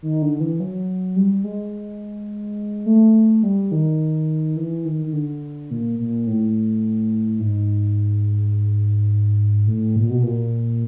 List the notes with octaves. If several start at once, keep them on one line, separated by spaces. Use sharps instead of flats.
D#3
D3
E3
F#3
G3
G#3
A3
G3
D#3
E3
D#3
D#3
D3
A#2
A#2
A2
G#2
A2
A#2
B2
A#2